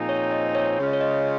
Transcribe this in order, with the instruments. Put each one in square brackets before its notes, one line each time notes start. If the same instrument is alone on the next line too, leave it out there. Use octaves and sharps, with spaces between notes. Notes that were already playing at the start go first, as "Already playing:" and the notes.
Already playing: [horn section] A#2 F3 C4 D#4 G#4
[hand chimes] C#5
D#5
C#5
[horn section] C#3 G#3 C#4 F4
[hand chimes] D#5
C#5
D#5